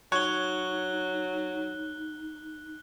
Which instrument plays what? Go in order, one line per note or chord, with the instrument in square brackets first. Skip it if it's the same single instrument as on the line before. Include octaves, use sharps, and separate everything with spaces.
[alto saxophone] F#3 [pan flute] D#4 [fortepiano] C#5 [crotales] F#6 G7